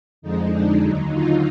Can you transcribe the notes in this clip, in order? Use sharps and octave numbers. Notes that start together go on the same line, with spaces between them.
F2 D3 F3 G#3 D#4
D4
D#2 D3 F#3 D#4
F4